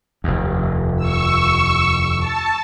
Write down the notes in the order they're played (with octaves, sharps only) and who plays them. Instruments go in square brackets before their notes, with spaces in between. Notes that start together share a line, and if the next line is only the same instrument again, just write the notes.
[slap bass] F1 D#2
[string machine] C#6 E6
A5